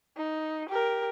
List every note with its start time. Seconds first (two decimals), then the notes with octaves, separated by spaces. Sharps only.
0.17 D#4
0.69 G4 A#4